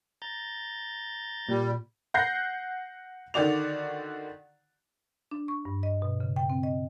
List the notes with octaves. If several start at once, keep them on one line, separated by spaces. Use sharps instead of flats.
A#5 G6 A6
A#2 G3
F#5 F#6 G6 A#6 C7
D3 D#3 F#4 D5 F7
D4
C#6
G2
D#5
B2
C#3
G5
C4
D#5